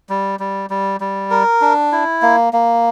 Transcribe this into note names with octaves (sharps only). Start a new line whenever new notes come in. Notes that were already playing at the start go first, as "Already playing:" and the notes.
G3
G3
G3
G3
A#4
D4
E4
A#3
A#3